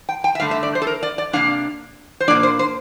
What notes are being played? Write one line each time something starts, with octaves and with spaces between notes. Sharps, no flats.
G5
G5
E5
G2 D3 A3 F5
E5
D5
C5
A4
A#4
D5
D5
C3 G3 A#3 D4 F5
C5
A#2 F3 A#3 D4 D5
C5
C5